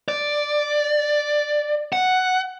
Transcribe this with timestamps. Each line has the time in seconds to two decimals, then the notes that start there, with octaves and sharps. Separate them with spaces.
0.08 D5
1.93 F#5